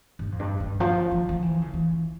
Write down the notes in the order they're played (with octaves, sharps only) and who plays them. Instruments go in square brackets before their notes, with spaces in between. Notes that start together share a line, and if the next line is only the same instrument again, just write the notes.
[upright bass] G2
F2
G2
G2
F3
F3
F3
E3
C#3
E3